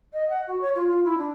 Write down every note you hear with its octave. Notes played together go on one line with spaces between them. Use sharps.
D#5
F#5
F#4
C#5
F4
F4
E4
D4